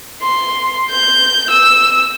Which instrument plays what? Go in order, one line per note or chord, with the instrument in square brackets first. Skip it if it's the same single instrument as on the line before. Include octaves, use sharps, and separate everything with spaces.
[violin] C6
G6
E6